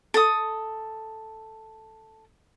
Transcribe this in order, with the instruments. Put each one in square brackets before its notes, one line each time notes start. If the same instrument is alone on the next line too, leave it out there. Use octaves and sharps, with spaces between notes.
[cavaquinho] A4 D#6